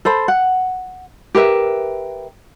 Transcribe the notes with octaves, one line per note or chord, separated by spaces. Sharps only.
A4 C5 B5
F#5
G4 A#4 B4 E5